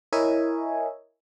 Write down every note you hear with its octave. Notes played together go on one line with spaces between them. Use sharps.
E4 A#4 C#5 D#5 E5 G#5